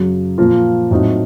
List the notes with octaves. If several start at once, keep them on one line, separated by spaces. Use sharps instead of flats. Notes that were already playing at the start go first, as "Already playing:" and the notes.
Already playing: F#2 C#3 F#3
A#2 F3 A#3 F4
A2 F#3 C4 D#4 F#4